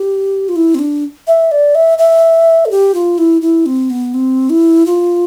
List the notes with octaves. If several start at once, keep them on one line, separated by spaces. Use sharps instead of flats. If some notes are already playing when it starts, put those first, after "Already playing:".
Already playing: G4
F4
E4
C4
D4
E5
D5
E5
E5
A4
G4
F4
E4
E4
C4
B3
C4
E4
F4